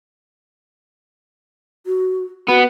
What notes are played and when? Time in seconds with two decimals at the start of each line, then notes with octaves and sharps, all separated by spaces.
1.86 F#4
2.48 B3 F#4